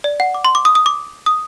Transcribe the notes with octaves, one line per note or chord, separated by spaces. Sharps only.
D5
F#5
D6
C6
D6
D#6
D#6
D6
D#6